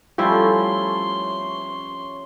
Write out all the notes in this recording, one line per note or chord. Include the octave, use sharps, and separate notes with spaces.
F3 G3 A3 C#4 E4 C6